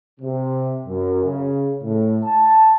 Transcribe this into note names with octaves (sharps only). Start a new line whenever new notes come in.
C3
F#2
C#3
A2
A5